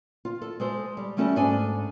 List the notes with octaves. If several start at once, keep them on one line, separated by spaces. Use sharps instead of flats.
F4
A4
G#3 A4 C5
G3
G3 A3 C#4 F#4 A4
G#2 D4 A4 G#5